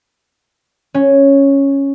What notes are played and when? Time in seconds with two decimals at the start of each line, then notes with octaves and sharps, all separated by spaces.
0.94 C#4